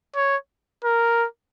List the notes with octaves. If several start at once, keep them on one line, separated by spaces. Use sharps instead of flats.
C#5
A#4